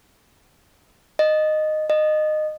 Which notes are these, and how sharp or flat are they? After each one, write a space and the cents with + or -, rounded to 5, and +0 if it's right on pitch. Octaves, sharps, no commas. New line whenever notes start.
D#5 -10
D#5 -20